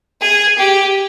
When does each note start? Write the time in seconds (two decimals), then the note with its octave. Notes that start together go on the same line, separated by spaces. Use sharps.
0.21 G#4
0.58 G4